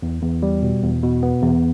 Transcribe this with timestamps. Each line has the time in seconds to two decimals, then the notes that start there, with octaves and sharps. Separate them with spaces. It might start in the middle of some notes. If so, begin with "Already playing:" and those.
0.02 E2
0.22 E2
0.43 G3
0.62 B2
0.83 E2
1.03 B2
1.23 B3
1.43 E2